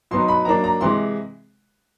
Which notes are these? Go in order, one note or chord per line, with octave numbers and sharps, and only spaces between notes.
B2 F#3 B3 D#4 C6
B5
F#3 A#3 D4 A#5
A#5
C3 E3 G#3 C6